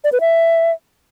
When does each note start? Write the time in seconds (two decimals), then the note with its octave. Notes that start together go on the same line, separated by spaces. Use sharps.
0.04 D5
0.12 B4
0.21 E5